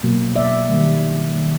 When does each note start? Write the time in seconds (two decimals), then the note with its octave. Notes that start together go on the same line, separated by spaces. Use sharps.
0.03 B2 F#3 A#3
0.36 D5 E5
0.67 D#3 G3 A#3
1.32 D#3 G3 A#3